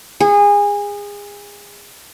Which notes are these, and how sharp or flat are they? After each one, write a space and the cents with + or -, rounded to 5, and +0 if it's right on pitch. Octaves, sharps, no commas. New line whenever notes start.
G#4 -25